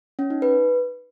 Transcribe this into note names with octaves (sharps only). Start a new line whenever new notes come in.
C#4
D#4
B4